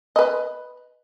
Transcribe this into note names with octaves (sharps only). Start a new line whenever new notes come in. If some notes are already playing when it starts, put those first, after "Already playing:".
B4 D#5